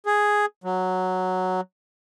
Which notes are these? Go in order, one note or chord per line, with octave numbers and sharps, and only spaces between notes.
G#4
F#3